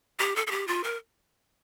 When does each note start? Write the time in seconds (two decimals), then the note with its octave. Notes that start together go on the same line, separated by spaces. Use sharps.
0.19 G4
0.36 A4
0.47 A4
0.51 G4
0.67 F4
0.84 A#4